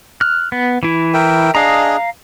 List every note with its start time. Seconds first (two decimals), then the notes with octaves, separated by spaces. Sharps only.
0.21 F6 F#6
0.52 B3
0.83 E3 E4
1.14 A#4 E5 G5
1.55 D4 G#4 D#5 F5 A#5